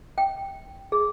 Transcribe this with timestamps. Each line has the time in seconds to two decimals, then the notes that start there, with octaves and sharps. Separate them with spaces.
0.18 G5
0.92 G#4